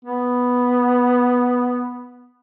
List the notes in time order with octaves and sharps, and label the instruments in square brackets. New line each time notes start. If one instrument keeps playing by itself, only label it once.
[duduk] B3